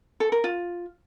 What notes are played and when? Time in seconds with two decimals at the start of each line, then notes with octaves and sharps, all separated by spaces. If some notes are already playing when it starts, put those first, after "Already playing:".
0.20 A4
0.32 A#4
0.44 F4